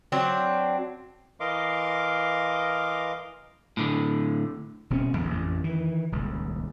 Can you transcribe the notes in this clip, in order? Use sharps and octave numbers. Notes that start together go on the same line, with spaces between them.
F#3 C4 D4
E3 A#4 D#5 F5 C6 D6
A2 D3
D#1 B2 C4 C#4
A1 E2 D3
A1 F2
D#3 E3
D#1 C#2